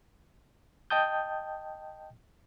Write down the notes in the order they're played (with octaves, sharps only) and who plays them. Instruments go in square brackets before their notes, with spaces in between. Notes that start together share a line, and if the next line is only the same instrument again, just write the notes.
[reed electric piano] D#5 G5 A5 D#6 G6